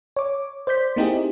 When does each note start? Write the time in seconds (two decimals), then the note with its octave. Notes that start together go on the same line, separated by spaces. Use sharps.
0.16 C#5 D6
0.67 C5 D5 G6 B6
0.96 A#3 C4 D#4 E4 G4 G#4